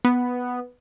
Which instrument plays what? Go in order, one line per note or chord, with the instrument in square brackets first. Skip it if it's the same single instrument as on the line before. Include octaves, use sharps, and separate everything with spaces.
[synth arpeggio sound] B3